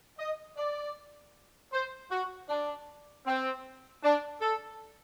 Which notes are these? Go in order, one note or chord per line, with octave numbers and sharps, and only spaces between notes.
D#5
D5
C5
F#4
D4
C4
D4
A4